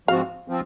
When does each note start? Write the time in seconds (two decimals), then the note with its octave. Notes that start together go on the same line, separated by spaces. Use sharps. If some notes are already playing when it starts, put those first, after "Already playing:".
0.08 G#2 F3 C4 F#4 F5
0.48 F3 C4